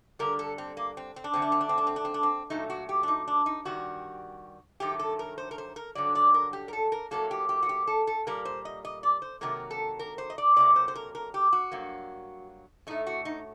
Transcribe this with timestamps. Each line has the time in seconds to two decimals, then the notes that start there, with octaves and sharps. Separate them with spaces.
0.19 G2 D3 G3 A#4
0.39 A4
0.58 C4
0.77 A#3
0.97 C4
1.16 C4
1.24 D4
1.34 F#2 D3 A3 C4
1.42 D4
1.52 C4
1.61 D4
1.69 C4
1.78 D4
1.87 C4
1.96 D4
2.05 C4
2.14 D4
2.23 C4
2.50 A#2 F#3 A3 D#4
2.70 F#4
2.89 G4
3.03 D4
3.08 D#4
3.27 D4
3.46 D#4
3.65 G2 D#3 G3 F#4
4.80 G2 D#3 F#3 A3 G4
4.99 A4
5.19 A#4
5.38 C5
5.51 A#4
5.58 C5
5.76 A#4
5.95 G2 D3 F#3 D5
6.15 D5
6.34 A#4
6.53 G4
6.68 A#4
6.73 A4
6.92 A#4
7.11 A2 F#3 A#3 A4
7.31 G4
7.49 G4
7.63 F#4
7.69 G4
7.87 A4
8.07 A4
8.27 A#2 G3 A#3 A#4
8.45 C5
8.65 D#5
8.85 D#5
9.03 D5
9.22 C5
9.41 C3 D#3 F#3 A#3 A#4
9.71 A4
9.99 A#4
10.18 C5
10.30 D#5
10.38 D5
10.56 C3 F#3 A#3 D5
10.76 C5
10.88 C5
10.95 A#4
11.15 A#4
11.34 G4
11.53 F#4
11.72 G2 F#3 A#3
12.87 A2 A3 D#4
13.07 F#4
13.25 D#4